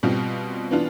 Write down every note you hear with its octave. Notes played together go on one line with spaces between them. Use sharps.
B2 G3 C4 F4
E3 B3 D4 F4